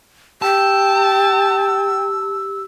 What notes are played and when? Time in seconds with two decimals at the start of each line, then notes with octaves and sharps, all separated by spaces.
0.42 G4 G5 A5 E6